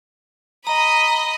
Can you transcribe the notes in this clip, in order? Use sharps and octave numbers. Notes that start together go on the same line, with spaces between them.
D#5 A#5 B5